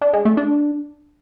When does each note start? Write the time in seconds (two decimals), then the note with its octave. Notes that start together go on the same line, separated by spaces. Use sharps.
0.01 D4
0.13 G#3
0.25 A3
0.37 D4